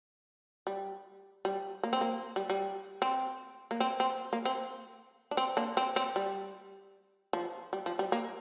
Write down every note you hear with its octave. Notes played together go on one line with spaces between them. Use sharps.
G3
G3
A#3
C4
A#3
G3
G3
C4
A#3
C4
C4
A#3
C4
D4
C4
A#3 D4
C4
C4
G3
F3
G3
F3
G3
A#3